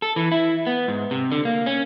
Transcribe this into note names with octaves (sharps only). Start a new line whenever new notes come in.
A4
E3
E4
B3
G#2
C3
D3
A#3
C#4